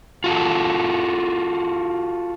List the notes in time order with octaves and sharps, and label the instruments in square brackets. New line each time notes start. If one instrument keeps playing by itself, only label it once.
[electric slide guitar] F4 F#4 A4